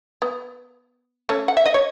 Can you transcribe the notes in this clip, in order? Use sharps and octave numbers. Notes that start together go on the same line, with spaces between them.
B3
A3 C#4
F#5
E5
D#5
C#5